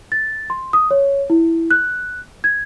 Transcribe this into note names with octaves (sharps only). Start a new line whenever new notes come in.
A6
C6
D#6
C#5
E4
F#6
G#6